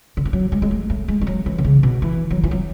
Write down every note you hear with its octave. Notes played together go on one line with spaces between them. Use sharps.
D3
E3
F#3
G#3
G#3
A3
A3
G#3
G#3
F#3
E3
D3
C#3
B2
E3
F#3
E3
F#3